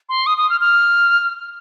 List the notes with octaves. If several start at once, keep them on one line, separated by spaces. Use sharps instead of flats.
C6
D#6
D#6
F6
F6